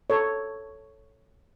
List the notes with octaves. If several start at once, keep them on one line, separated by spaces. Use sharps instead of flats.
A4 C#5